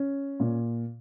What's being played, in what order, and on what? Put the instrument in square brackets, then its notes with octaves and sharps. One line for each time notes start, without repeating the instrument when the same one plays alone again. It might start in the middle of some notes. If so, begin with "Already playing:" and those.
Already playing: [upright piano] C#4
A#2